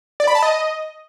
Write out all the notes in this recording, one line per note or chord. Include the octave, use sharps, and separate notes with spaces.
D5
B5
A5
D#5